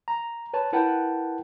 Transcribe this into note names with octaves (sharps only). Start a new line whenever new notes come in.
A#5
B4 C#5 A5
E4 A#4 B4 F#5 G5 A5